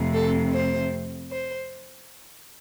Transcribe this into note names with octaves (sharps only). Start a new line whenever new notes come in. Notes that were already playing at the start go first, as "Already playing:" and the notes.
Already playing: F2 C3 A3 C4
A4
C5
C5